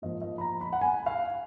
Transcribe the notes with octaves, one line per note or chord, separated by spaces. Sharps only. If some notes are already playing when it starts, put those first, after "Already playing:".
G#2 F3 A#3 D#5
D#5
B5
A#5
B5
F#5
G#5
F5